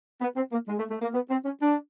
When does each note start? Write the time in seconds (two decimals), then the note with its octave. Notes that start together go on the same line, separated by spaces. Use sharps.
0.21 B3
0.35 C4
0.51 A#3
0.68 G#3
0.79 A3
0.90 A3
1.02 A#3
1.14 B3
1.30 C4
1.45 C#4
1.61 D4